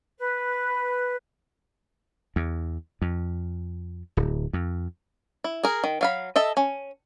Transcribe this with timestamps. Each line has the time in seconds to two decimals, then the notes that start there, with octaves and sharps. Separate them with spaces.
0.18 B4
2.36 E2
3.02 F2
4.17 D1
4.53 F2
5.44 E4
5.63 G#4 A#4
5.84 D#3
6.01 F#3 F5 B5
6.36 A4 D#5 E5
6.57 C#4